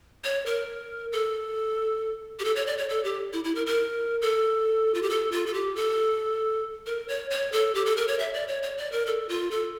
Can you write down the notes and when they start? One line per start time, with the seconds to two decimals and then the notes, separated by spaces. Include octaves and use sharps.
0.24 C#5
0.46 A#4
1.12 A4
2.39 G4
2.45 A4
2.56 C#5
2.67 D5
2.78 C#5
2.89 A4
3.04 G4
3.33 E4
3.44 E4
3.55 A#4
3.66 A#4
4.22 A4
4.94 F4
5.02 G4
5.10 A4
5.32 F4
5.46 A4
5.54 G4
5.76 A4
6.86 A#4
7.08 C#5
7.30 C#5
7.52 A4
7.75 G4
7.86 A4
7.97 A#4
8.08 C#5
8.19 E5
8.34 D5
8.48 C#5
8.63 C#5
8.78 D5
8.92 A#4
9.07 A4
9.29 F4
9.51 A4